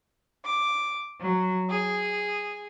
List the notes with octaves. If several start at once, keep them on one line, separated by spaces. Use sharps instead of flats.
D6
F#3
G#4